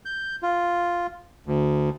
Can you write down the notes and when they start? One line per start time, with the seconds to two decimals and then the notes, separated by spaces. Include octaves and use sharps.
0.05 G6
0.43 F4
1.46 D2